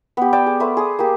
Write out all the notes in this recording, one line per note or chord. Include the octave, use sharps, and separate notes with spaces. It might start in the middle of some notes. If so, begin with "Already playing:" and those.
B3 G4
D5 G5 A5
G#4
A3 B4 C5
G#4 D#6
A#3 G4